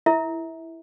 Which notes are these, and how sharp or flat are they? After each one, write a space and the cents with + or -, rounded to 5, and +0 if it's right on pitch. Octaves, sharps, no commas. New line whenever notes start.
E4 +0 A#4 -35 E5 -25